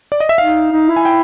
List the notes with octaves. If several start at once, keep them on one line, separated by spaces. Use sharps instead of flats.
D5
D#5
E5
D#4 F5
D#4
E4
G#5
G5